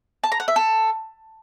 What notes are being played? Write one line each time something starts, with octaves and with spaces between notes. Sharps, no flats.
A5
A#5
F#5
E5
A4